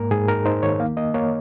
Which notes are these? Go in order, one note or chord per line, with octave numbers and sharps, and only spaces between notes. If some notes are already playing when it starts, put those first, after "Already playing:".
Already playing: G#2 A#3 A#4
G#2 G#4
D#4 A#4
D#4 C5
D#3 C#5
A#3 F5
A#3 D#5
A#3 C#5